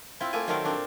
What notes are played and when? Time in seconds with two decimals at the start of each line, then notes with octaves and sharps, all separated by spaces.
0.20 C4 E4 F4
0.33 A3 A#3 F4 G#5
0.47 D#3 F#3 A3 C4 A#4 F5
0.65 A#2 C4 D4